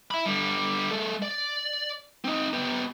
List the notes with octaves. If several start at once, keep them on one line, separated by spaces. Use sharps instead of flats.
E5 B5
D3 G3
G#3 A4
D5
C4 D#4
B3 G4